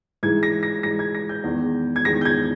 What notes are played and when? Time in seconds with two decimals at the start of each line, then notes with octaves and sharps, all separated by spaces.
0.23 G#2 E3 G#3 G#6
0.43 A#6
0.63 A#6
0.83 G#2 E3 G#3 A#6
0.99 G#6
1.15 A#6
1.29 G6
1.44 E2 D#3 G#3
1.96 G#6
2.05 E2 D#3 G#3 A#6
2.21 G6
2.25 G#6